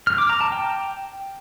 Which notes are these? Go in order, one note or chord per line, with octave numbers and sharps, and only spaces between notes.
F6
D6
A#5
A5
G5